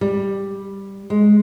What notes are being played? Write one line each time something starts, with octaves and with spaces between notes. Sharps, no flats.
G3
G#3